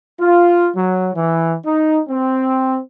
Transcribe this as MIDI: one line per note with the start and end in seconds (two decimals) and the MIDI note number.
0.19 0.70 65
0.76 1.10 54
1.15 1.56 52
1.66 2.00 63
2.09 2.80 60